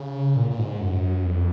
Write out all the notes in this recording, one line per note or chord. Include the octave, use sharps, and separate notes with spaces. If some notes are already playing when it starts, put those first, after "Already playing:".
Already playing: C#3
A#2
A#2
G#2
F#2
F2